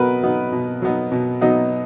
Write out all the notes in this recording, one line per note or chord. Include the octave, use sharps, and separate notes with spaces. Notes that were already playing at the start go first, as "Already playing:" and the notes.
Already playing: B2 F#3 B3 D#4 F#4 A#4 B4
F#3 B3 D#4
B2
F#3 B3 D#4
B2
F#3 B3 D#4